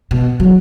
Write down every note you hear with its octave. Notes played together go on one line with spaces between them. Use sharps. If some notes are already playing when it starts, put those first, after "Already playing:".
B2
F#3